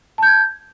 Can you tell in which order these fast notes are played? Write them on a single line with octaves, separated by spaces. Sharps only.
A5 G6 G#6